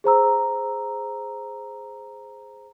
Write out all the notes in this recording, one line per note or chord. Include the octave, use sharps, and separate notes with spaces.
G#4 C5 A#5 E6